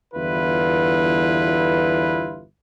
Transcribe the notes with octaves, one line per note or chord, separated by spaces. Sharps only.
G1 E2 D3 E4 F4 B4